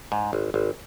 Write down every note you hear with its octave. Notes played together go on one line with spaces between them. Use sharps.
G#2
G#1
G#1